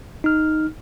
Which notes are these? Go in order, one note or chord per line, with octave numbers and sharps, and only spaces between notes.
D#4 F6